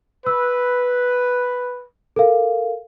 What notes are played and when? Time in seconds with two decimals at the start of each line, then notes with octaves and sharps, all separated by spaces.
0.27 B4 E6
2.16 A4 A#4 F5